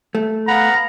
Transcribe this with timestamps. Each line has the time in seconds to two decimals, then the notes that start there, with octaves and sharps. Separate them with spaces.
0.15 A3
0.48 B3 F5 F#5 A#5 B5